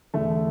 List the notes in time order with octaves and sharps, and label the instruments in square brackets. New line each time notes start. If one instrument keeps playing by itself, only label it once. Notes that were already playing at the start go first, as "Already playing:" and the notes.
[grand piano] E2 D3 A3